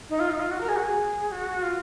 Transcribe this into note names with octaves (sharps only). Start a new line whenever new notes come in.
D#4
F4
D#4
F4
F#4
A#4
G#4
F#4
G#4
F#4
F4